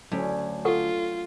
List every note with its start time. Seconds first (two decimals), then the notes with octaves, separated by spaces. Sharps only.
0.12 D2 F#3 C#4
0.65 F4 A4 F#5 C#6